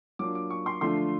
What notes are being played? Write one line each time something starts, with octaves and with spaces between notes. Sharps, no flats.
F#3 A#3 D4 F4 D6
D6
C#6
C6
D3 F3 A3 D4 F4 C6